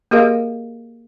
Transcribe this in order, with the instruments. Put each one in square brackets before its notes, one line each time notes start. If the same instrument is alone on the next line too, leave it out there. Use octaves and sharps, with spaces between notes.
[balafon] A#3 G4 G#4 A#4 D#5 F5